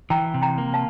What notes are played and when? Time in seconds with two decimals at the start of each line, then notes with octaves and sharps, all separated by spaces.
0.10 E3 G5 A#5
0.34 C3
0.42 G5 A#5
0.58 A#3
0.74 F5 A5